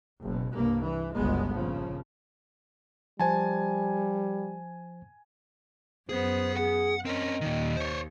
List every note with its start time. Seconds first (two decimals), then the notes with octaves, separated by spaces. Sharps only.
0.22 F#1 B2
0.55 C2 G2 A#3
0.84 E3
1.16 G1 C#2 F#2 G#3 B3
1.53 A#1 C#3 F3
3.20 F3 G3 C5 G#5 A5
6.09 F#2 B3 G#4 C5
6.57 G#4 F#5
7.05 C4 C#4 A#4 D#5
7.41 D#2 A#2 D#3
7.77 C5 C#5